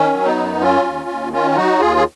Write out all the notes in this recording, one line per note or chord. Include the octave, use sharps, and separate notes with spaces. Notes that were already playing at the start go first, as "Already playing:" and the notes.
Already playing: D#3 C#4
F#3
B3 D#4
F#2
F#3 C#4 F4
D#2
D#2
D#3 C#4 F4
F4
F#3 D#4 F#4
D#2 F4 G#4
G#4